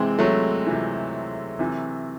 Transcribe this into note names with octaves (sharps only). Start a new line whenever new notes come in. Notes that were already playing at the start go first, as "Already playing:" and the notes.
Already playing: C3 E3 G#3 C4
F#3 A3
C3 E3
C3 E3